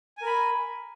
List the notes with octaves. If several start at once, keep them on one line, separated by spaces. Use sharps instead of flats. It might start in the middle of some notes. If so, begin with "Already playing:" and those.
A#4 G#5 B5